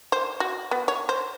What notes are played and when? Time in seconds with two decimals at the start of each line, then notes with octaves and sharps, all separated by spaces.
0.12 C5
0.40 F#4
0.71 B3
0.88 C#5
1.09 C5